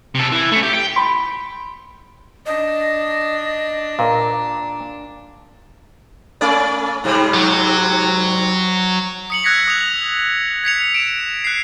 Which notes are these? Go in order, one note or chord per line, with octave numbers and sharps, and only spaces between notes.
C3 A4
E3
A3 C#4
G4
G5
B5 C6 B6
D4 D#5
A#2 G#4 A#4 F5
A3 C#4 D5
G#2 C3 G3
F#3
D#6 C#7 F#7
E6 F#6 G#6 A#6 B6 C#7
D#6 F7
G#6 B6 C#7 F7
D7 E7
F#6 C7